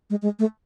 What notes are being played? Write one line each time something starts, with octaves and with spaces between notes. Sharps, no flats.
G#3
G#3
A3